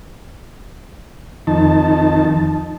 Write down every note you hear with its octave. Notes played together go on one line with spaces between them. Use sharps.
F2 D#3 D#4 A5